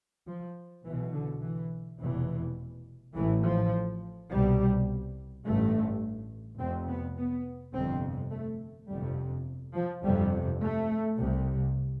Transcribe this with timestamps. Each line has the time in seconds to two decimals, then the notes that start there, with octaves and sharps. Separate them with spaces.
0.27 F3
0.85 B1 B2 E3
1.13 D3
1.42 E3
2.00 F1 E2 B2 E3
3.15 A1 A2 E3
3.43 F3
4.29 C2 B2 G3
5.44 A1 G2 A3
6.59 F1 F2 C3 C4
6.88 B3
7.17 B3
7.74 G1 F2 C3 C4
8.31 A3
8.89 G1 F2 C3 G3
9.75 F3
10.03 G1 F2 C3 G3
10.61 A3
11.18 C2 C3